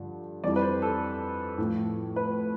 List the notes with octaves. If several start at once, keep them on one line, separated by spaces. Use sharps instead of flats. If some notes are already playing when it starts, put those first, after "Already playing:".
Already playing: G2 D3 F3
F2 E3 G3 D5
B4
C5
A4
A2 F3
B4